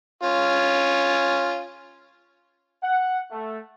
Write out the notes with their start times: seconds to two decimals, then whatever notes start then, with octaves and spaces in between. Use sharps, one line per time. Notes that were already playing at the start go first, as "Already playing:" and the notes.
0.23 C#4 F4
2.82 F#5
3.31 A3